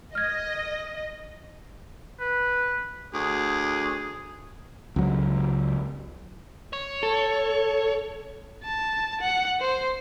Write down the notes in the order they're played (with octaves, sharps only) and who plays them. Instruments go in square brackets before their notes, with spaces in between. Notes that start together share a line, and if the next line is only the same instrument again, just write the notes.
[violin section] D#5 [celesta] F6 G#6
[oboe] B4
[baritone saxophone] D2 [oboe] G#4
[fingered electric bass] C#2 F#3
[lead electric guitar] C#5
[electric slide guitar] A4
[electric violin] A5
F#5
C5